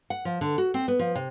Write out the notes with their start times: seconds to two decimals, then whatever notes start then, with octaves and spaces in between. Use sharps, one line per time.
0.10 F#5
0.25 F3
0.41 D3
0.58 F#4
0.74 C4
0.88 B3
0.99 F3
1.15 C3